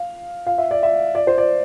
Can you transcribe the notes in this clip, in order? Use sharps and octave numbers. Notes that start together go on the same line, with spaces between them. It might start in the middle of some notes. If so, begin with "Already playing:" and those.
Already playing: F5
F5
E5
D5
E5
D5
C5
D5